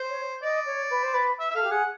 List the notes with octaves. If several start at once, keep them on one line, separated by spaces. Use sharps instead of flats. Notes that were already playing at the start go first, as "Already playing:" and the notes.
Already playing: C5
C#5
D5 D#5
C#5
B4
C5
B4
E5
E5
A4 F5
G4
G#4 F#5